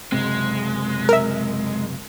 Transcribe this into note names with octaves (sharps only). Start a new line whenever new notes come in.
F#1 C3 G#3 C4
A#4 E5